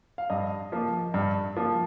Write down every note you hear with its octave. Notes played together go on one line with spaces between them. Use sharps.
F5
G2 D#5
F3 A#3
G2
F3 A#3